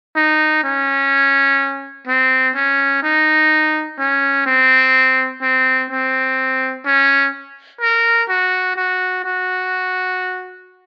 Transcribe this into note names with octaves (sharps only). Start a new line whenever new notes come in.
D#4
C#4
C4
C#4
D#4
C#4
C4
C4
C4
C#4
A#4
F#4
F#4
F#4